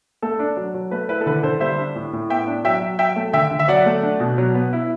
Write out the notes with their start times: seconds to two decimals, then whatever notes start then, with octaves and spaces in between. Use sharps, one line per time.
0.22 A3 A4
0.39 D4
0.57 F#3
0.74 F#3
0.91 A3 B4
1.09 E4 B4
1.21 A4
1.26 D3 B4
1.43 D3 A4 C5
1.60 G3 C5 E5
1.78 D4
1.95 A2
2.13 A2
2.30 B3 E5 G5
2.47 D4
2.65 F#3 E5 G5
2.81 F#3
2.99 F#3 E5 G5
3.16 A3
3.33 D3 E5 G5
3.51 D3
3.59 E5
3.68 F#3 D5 F#5
3.86 A3
4.03 D4
4.20 B2
4.38 F#3
4.55 B3
4.73 E4